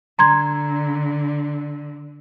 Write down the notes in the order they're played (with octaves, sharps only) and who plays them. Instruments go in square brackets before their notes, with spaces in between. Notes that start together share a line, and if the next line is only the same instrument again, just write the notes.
[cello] D3 [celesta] A#5 C6 G#6